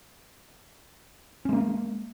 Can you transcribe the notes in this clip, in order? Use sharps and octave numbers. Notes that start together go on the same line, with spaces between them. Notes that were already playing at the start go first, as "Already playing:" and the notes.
G#3 A#3 C#4